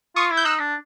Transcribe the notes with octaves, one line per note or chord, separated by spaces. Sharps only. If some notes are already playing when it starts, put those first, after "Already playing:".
F4 C#6 D#6
E4
G6
D#4 E6 F#6
D4